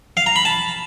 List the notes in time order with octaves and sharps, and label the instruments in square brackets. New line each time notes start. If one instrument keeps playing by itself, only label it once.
[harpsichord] F5
A#5
B5
A5